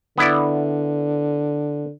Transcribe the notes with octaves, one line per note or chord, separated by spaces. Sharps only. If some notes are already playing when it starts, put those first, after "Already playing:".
D3 B3 E4 D5